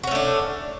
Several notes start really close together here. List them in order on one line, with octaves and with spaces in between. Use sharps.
F#4 C#4 A3 D4